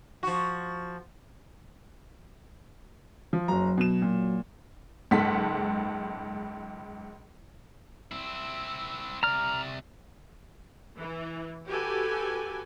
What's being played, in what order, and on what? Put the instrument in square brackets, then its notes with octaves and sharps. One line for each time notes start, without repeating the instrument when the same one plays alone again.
[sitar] F3 F#4
[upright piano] F3
[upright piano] F#1 A#5 [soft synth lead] F#3
[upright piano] B2 E7
A#2
[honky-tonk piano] F#1 C#2 G#2 A4 F#5 B6
[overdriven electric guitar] C4 E4
[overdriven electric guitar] C3 D5 [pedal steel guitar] A#5 F6
[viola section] E3
F#4 G4 A4 B4 G#5